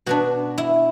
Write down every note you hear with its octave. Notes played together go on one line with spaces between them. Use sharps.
B2 B3 D4 F#4
E4